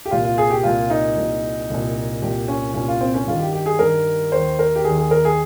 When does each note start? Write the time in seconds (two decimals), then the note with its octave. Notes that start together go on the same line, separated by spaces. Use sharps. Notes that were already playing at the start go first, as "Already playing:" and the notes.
0.06 G4
0.11 C2 A#2 F4
0.24 F4
0.38 G#4
0.50 G4
0.63 C2 A#2 F4
0.90 D#4
1.16 C2 A#2
1.70 C2 A#2
2.22 C2 A#2 G4
2.48 C#4
2.74 C2 A#2 C#4
2.88 F4
3.01 C4
3.14 C#4
3.27 G2 D#3 F4
3.40 G4
3.53 G4
3.66 G#4
3.79 G2 D#3 A#4
4.32 D#2 D#3 C5
4.59 A#4
4.76 G4
4.84 D#3 G#4
4.89 D#2
4.98 G#4
5.11 A#4
5.25 G#4